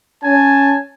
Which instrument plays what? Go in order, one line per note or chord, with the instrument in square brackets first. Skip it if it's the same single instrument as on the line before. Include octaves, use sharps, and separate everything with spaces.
[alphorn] C#4 [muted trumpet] G#5 [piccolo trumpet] A5